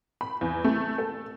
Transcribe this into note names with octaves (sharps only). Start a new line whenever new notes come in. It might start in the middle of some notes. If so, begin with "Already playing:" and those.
B5
E2
A3
A4